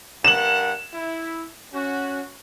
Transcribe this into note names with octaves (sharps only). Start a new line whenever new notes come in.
G2 A#4 F#5 E7 F#7
E4
C#4 F#4